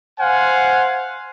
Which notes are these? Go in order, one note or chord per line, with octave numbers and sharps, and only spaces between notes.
C5 F5 F#5 G#5